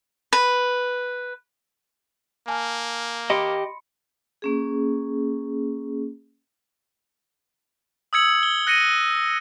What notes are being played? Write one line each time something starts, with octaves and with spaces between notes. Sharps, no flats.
B4
A#3 G#5 A5 F6
G4 D#5 B5 C6 C#7
A#3 C#4 G#4
D#6 E6 G#6 C#7 F#7
G7
F#6 A#6 C#7 D#7